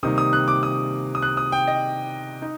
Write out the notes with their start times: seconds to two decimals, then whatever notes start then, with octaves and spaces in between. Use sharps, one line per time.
0.03 C3 D#3 G3 A#3 D#4 D#6
0.18 D#6
0.33 F#6
0.48 D6
0.63 D#6
1.15 D#6
1.22 F#6
1.37 D#6
1.52 G5
1.68 D#5
2.42 D#4